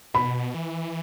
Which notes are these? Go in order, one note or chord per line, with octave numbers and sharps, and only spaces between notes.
B2 B5
E3